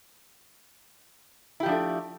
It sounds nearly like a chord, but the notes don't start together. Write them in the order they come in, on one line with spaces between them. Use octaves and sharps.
E4 G4 F3 D4 A3